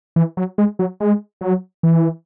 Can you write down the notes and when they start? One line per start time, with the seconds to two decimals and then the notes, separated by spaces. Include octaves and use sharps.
0.16 E3
0.37 F#3
0.58 G#3
0.79 F#3
1.00 G#3
1.41 F#3
1.83 E3